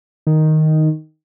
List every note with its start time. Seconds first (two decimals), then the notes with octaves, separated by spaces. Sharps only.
0.27 D#3